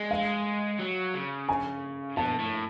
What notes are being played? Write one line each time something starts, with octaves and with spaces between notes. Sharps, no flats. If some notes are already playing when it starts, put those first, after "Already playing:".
Already playing: G#3
F5
F#3
C#3
G#5
B2 A5
A2